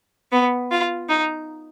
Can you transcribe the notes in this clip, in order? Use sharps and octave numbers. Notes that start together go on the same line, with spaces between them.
B3
F4
D#4